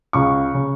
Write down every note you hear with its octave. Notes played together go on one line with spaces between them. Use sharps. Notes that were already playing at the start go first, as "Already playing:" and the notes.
C#2 C#3 C#6
C#3